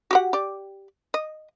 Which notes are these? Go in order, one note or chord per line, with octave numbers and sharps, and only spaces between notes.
F#4 G4 F#5
G4 D5
D#5